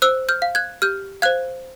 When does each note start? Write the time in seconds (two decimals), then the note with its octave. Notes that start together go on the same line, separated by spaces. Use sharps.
0.02 C5 E6 F#6
0.29 F6 G6
0.42 F5
0.55 F#6 G#6
0.82 G4 F6 G6
1.22 C5 F5 F#6 G#6